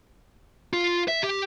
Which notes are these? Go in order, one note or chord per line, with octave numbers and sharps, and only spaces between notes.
F4
E5
G4